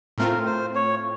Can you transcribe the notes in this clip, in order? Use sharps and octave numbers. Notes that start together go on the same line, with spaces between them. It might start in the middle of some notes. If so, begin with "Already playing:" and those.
A2 A3 C4 F4 A#4
C5
C#5